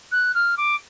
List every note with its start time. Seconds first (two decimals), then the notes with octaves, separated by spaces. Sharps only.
0.12 F#6
0.35 F6
0.57 D6